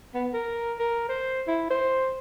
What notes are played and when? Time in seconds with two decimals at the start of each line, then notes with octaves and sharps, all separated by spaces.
0.14 B3
0.33 A#4
0.79 A#4
1.09 C5
1.47 E4
1.70 C5